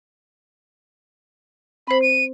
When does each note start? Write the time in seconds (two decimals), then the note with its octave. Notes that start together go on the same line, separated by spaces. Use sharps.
1.87 C4 C5 B5
2.02 D#7